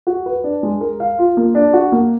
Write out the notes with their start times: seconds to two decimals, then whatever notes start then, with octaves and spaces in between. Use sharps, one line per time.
0.07 F#4
0.26 B4
0.44 D4
0.63 G#3
0.81 A#4
1.00 F5
1.18 F4
1.37 A#3
1.55 D4
1.73 F#4
1.92 A#3